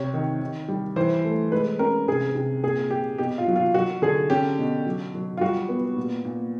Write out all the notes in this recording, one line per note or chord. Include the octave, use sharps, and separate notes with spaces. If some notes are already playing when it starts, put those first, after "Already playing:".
Already playing: C3 C#5
D#3
D#3
G3
E3 C5
A3
G#3 B4
C#4 A#4
C3 G#4
C3
A#2 G#4
A#2 G4
B2 G4
F4
F#3
F4
F#3 F#4
D3 G#4
C#4 G4
B2
F#3
F#3
F4
G3 F#4
B3
A#2
A#2